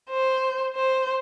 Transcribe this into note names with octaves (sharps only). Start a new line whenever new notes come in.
C5
C5